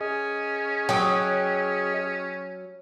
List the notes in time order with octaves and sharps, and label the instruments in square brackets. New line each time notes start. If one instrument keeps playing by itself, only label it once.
[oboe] C#4 [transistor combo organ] G#4 D#5
[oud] F#3 [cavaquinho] G5 D#6